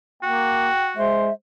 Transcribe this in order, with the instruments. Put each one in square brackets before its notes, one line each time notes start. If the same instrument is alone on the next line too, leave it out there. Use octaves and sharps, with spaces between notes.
[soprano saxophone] A#3 [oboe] F#4 [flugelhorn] G5
[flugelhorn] G#3 [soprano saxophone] C5 [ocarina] E5